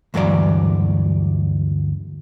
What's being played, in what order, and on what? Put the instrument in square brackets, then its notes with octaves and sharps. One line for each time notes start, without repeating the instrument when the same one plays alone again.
[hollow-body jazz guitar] D2 G2 E3 F#3 D5